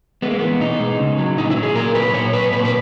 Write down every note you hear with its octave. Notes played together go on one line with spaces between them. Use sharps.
G#3 B3
A#3
E3 B3
B2 D#4
G#3
C#3
F#3
A#2 D#4
E4
F#3
G#4
A#2 A#4
F#3 B4
A#2 C#5
F#3 B4
A#2 B4
B4